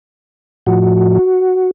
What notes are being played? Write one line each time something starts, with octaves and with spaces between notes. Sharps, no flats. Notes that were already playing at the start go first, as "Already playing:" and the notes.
A2 F3 F#4